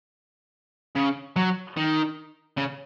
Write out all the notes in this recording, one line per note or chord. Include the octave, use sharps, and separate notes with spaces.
C#3
F#3
D#3
C#3